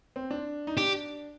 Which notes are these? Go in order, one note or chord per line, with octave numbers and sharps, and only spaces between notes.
C4
D4
D#4
D4 G4